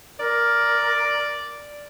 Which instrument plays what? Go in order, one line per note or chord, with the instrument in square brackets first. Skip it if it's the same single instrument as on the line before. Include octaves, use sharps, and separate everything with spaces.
[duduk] A#4 [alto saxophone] D5